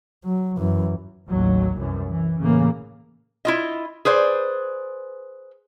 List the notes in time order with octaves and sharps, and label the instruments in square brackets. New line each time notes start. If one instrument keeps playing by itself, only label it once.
[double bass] F#3
F#2 E3
[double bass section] A1 D#2 F#3
C2 F#2 E3
E3
A2 C#3 E3 A#3
[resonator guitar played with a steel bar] E4 F4 D#5
G#4 B4 C5 D5